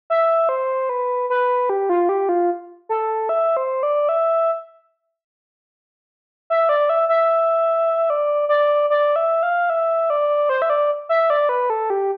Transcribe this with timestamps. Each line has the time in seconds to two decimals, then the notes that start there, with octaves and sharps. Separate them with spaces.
0.10 E5
0.49 C5
0.89 B4
1.30 B4
1.70 G4
1.89 F4
2.09 G4
2.29 F4
2.89 A4
3.29 E5
3.57 C5
3.83 D5
4.09 E5
6.50 E5
6.69 D5
6.89 E5
7.09 E5
8.10 D5
8.49 D5
8.90 D5
9.16 E5
9.43 F5
9.70 E5
10.10 D5
10.49 C5
10.62 E5
10.70 D5
11.09 E5
11.30 D5
11.49 B4
11.70 A4
11.90 G4